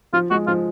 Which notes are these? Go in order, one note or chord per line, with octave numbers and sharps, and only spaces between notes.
F3 F4
G#3 F#4
F3 F4